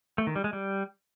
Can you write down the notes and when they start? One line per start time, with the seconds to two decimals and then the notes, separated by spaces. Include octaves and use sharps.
0.18 A3
0.27 D#3
0.36 G3
0.44 G#3
0.53 G3